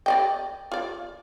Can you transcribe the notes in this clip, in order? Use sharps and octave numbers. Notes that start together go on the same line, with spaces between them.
D5 D#5 G5
F4 D5